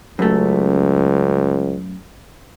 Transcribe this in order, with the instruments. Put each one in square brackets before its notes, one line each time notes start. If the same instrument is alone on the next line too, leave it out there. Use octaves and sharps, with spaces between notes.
[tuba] C#2 [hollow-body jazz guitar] F#2 A3